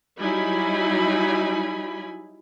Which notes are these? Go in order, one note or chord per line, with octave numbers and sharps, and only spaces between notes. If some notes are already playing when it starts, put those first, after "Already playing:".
F#3 G3 D#4 E4 G#5 B5